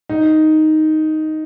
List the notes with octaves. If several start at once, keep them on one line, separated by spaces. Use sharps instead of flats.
D#4